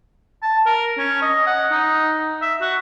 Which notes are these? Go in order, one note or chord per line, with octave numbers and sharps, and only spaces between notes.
A5
A#4
C#4
D#5
F#5
D#4
E5
F#4